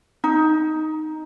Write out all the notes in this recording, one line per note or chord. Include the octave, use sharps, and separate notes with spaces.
D#4